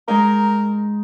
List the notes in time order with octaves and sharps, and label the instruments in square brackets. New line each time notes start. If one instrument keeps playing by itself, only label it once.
[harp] G#3 D#4 [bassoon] A#4